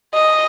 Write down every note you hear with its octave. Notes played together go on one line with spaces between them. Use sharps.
D#5